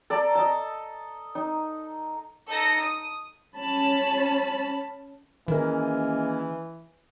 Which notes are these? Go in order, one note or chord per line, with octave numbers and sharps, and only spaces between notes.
A4 D5 A#5
D#5 A5
D#4
D#4 A4 A#6
D#6
C#4 A5 B5
D#3 E3 G#3 A#3 C#4 A#4 B4